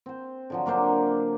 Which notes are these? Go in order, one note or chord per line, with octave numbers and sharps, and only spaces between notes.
C4 C5
D3 F3 F#3
F#3 A#3 D4 C5